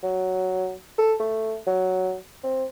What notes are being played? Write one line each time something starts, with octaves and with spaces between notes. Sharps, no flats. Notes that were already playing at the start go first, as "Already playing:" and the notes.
F#3
A4
A3
F#3
C4